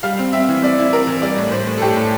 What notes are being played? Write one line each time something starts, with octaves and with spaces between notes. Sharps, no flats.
G3 F5
C4
C4 E5
E3
C4 D5
E4
C4 A#4
E3
G3 D5
A2
A2 C5
A2
A4
A2 G4
A2